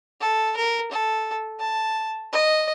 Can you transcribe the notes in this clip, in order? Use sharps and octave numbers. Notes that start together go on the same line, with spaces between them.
A4
A#4
A4
A5
D#5